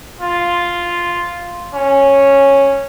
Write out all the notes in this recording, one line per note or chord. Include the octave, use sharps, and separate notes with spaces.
F4
C#4